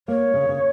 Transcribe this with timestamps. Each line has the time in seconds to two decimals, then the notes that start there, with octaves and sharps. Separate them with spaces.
0.08 A#3 C#5
0.34 C#3
0.49 C#3